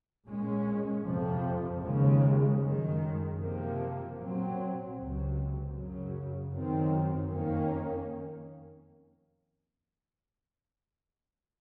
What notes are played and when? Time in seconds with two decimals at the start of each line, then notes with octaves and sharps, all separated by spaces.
0.25 A#2 G#3 C#4
1.04 F2 C3 F3
1.82 D#2 C#3 F3 G#3
2.60 F#2 D#3 G#3
3.38 C3 F3 A#3
4.17 A#2 F#3 C4
4.94 C#2 C3 F#3
5.74 F#2 C#3 F#3
6.51 F#2 D#3 F#3 C4
7.29 F2 D#3 A#3 C#4